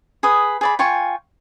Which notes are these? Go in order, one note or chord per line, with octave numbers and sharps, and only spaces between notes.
G#4 B4 D#6
G#4 D5 B5
F4 G5 G#5 C#6